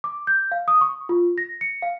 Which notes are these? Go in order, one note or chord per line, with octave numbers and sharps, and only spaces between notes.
D6
G6
F5
D#6
C#6
F4
A#6
C#7
F5